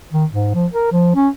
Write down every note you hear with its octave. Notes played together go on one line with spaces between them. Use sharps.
D#3
G#2
F3
A#4
F3
C#4